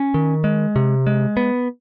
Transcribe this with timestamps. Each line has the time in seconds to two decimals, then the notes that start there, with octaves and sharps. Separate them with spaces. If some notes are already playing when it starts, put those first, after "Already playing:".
Already playing: C#4
0.14 D#3
0.44 G#3
0.76 C3
1.07 G#3
1.37 B3